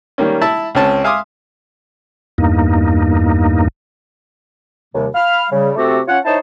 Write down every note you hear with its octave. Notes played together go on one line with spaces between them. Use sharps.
D#3 G3 A#3 C#4
E4 E5 A5 B5
C#2 C4 C#4 A5
E5 F5 G#5 C6 D6 D#6
E2 G2 A#3 D#4
D#2 C3 G3
F5 B5 F6
C#3 G3
C3 A3 C4 F#4 G4 A4
C#4 F4 C#5 F#5
D#4 E4 C5 C#5 A5